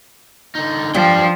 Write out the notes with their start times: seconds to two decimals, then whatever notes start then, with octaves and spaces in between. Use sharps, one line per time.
0.55 D3 D#4
0.95 F3 G3 D4 G5